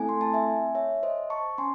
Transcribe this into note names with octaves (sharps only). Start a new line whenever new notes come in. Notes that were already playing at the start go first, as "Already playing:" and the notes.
Already playing: A3 C4 E4 A4 G#5
C6
A5
E5 G#5
C#5 E5
C5 D#5
A5 C#6
C#4 G#5 C6